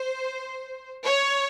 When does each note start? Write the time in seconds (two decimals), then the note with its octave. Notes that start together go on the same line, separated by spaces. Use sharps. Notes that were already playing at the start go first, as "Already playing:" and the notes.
Already playing: C5
1.06 C#5